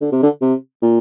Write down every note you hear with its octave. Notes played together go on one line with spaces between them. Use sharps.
D3
C3
D3
C3
A#2